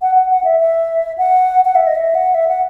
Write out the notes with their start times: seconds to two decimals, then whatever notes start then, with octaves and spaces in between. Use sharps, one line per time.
0.02 F#5
0.15 F#5
0.30 F#5
0.44 E5
0.60 E5
1.18 F#5
1.65 F#5
1.75 E5
1.87 D#5
1.95 E5
2.15 F#5
2.34 E5
2.48 F#5